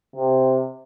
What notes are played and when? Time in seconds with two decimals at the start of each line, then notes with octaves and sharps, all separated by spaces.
0.16 C3